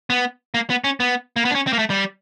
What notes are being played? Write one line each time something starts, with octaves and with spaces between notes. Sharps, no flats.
B3
A#3
B3
C#4
B3
A#3
B3
D4
C#4
C4
A#3
A3
G3